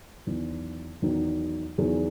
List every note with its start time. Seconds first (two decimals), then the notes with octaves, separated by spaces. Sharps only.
0.27 E2 D#3 F#3
1.02 E2 D#3 F#3
1.78 E2 D#3 F#3 G#4